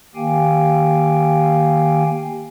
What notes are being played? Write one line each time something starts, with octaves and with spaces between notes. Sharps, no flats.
D#3 A#3 G4 F5 G5 G#5